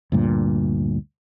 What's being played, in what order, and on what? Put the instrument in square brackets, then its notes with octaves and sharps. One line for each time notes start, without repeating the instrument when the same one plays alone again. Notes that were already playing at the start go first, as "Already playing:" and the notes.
[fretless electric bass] D2 G2 A#2